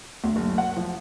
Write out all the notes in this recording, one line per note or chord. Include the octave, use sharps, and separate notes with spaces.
D2
F#1
F#5
F3